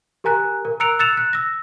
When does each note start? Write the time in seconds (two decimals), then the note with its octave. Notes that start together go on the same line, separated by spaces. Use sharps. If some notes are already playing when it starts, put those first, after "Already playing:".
0.24 G4 A#4 G#5 A#5 F#6
0.65 A#4
0.80 A#5 E6 F#6 C#7 D7 F7
0.99 E6 F#6 A6 C#7 E7 F7
1.17 F#6
1.33 E6 A#6